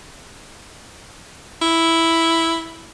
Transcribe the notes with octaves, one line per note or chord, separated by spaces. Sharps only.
E4